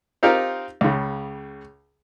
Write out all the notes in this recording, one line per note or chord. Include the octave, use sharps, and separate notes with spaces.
C4 D#4 F4 G4 A#4
C#2 C#3